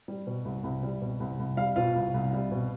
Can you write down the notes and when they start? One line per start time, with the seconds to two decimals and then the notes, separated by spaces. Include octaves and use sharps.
0.08 G3
0.27 B2
0.45 C2
0.64 C2
0.83 G3
1.01 B2
1.20 C2
1.39 C2
1.57 G3 F5
1.76 B2 F4 F5
1.96 C2
2.14 C2
2.33 G3
2.52 B2